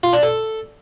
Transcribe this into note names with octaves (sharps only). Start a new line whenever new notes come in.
F4
D4
A4